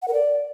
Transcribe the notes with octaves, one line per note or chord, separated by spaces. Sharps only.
F#5
A#4
D5